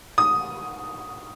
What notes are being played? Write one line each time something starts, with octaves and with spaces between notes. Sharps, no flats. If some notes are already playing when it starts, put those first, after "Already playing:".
D#6